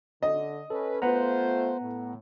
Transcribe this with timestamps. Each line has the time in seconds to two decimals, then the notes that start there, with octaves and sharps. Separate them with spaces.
0.23 D3 D#5
0.70 C#4 A4 B4
1.02 A3 B3 F4 B4 C5 F#5 A#5
1.81 A2